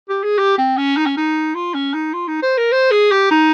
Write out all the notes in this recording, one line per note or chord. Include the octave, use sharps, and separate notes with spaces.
G4
G#4
G4
C4
C#4
D#4
C#4
D#4
F4
C#4
D#4
F4
D#4
C5
A#4
C5
G#4
G4
D#4